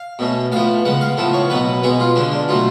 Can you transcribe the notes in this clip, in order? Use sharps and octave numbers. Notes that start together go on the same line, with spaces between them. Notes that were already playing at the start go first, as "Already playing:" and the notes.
Already playing: F5
B2 A3 C#4
A2 F3 B3 F5
C#3 G#3 B3 F#5
F5
A2 F3 B3 A4
C#5
B2 F#3 B3 B4
B2 G#3 B3 G#4
F4
D3 G#3 C#4 D4
D4
B2 F#3 A3 F4